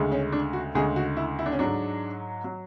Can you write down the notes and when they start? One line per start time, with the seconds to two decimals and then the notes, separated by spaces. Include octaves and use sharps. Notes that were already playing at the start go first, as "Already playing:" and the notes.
Already playing: D2 C#3 G#3
0.12 C#4
0.32 D4
0.53 F#4
0.75 D2 C#3 G#3 G#4
0.96 F#4
1.17 E4
1.39 E4
1.46 D4
1.52 C#4
1.59 G#2 F#3 D4
2.44 F#3